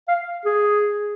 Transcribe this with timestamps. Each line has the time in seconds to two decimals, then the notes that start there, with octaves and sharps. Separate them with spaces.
0.08 F5
0.45 G#4